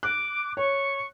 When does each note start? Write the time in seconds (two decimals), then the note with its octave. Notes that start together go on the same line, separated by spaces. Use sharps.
0.03 D6 F#6
0.57 C#5 C#6